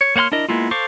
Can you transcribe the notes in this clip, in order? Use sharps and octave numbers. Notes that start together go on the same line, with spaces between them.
C#5
A#3 C#5 F#5 C6 F6
D4 E4 A#4 D#5
G#3 A#3 B3 E4 F4
A4 C5 F5 C#6 D6